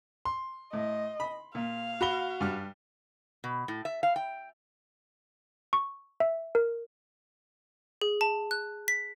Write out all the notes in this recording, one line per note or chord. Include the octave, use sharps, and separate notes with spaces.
C6
A2 D#5
B5
A#2 F5
F#4 B5 G7
G2 G3 F6
B2
A2
E5
F5
G5
C#6
E5
A#4
G#4
A5
F#6
B6